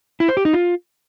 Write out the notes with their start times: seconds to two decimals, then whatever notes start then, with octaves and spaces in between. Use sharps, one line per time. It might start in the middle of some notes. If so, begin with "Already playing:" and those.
0.20 E4
0.29 C5
0.37 G4
0.45 D#4
0.53 F4